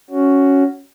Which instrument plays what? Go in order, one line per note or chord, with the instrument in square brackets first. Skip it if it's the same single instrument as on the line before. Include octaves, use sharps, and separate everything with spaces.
[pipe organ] C#4 F#4